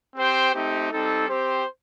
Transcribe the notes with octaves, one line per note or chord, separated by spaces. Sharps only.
C4 G4 C5 G5
A3 C4 D#4 G4
G3 C4 D#4 A4
C4 G4 C5